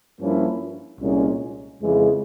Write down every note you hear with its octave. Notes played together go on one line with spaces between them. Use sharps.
G2 F3 A#3 C#4 E4
C2 A#2 G#3 C#4
F2 C#3 E3 G#3